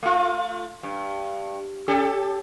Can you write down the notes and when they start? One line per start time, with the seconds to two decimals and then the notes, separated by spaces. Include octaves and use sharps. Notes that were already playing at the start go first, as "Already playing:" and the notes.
0.03 A3 F4
0.83 G2
1.88 C#4 G4 A4